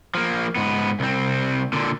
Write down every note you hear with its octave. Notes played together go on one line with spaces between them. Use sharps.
F3 A#3
G#2 B3
C2 C4
A#2 D3